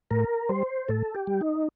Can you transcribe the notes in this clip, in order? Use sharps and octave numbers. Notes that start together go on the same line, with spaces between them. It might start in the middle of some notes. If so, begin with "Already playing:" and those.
A2 A#4
G3 C5
A2 A4
G4
G3
D#4